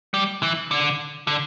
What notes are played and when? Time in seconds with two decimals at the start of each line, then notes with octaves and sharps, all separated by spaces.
0.14 G3
0.43 E3
0.71 D3
1.27 D3